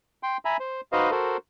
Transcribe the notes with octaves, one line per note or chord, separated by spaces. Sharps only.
G5 C6
E5 G#5 A#5 B5
C5
D#4 F#4 B4 C5 D#5 F5
F#4 A4 A#4 C5